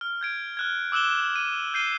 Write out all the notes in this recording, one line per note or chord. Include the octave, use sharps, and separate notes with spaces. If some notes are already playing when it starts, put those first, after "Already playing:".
F6
G6 G#6 D7
F6 F#6 G#6
D6 E6 F#6 E7 G7
D#7
G6 C7 D#7 G7